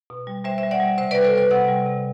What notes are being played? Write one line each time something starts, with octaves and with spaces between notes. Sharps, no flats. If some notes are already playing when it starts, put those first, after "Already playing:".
B2
G3
G3 C5 E5
C5 E5
G3
D5 F#5
G3
C3 C5 E5
G3 B4 D5
A4 C5
G3 B4 D5
C3 D5 F#5
G3
C3